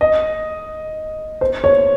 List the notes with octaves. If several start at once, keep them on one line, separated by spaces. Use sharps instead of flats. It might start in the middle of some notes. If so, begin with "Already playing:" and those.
D#5
C5
C#5